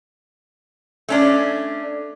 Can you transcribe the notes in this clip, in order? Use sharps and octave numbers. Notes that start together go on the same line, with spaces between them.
A3 C#4 D4